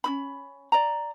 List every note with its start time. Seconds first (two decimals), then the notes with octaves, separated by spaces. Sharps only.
0.04 C#4 D#4 B5
0.72 D5 A#5